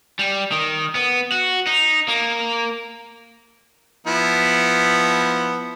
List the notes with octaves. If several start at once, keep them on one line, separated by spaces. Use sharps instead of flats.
G3
D#3
B3
F#4
D#4
A#3
F3 B3 E4